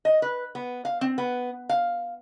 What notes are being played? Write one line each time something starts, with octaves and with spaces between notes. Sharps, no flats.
D#5
B4
B3
F5
C4
B3
F5